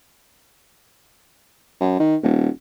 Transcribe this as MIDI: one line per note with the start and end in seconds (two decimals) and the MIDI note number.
1.81 1.97 42
2.00 2.16 51
2.23 2.49 27